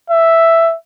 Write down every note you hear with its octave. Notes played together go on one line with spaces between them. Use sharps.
E5